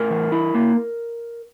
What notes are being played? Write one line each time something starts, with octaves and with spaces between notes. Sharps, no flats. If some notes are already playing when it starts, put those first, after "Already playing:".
Already playing: A2 A#4
E3
E4
A#3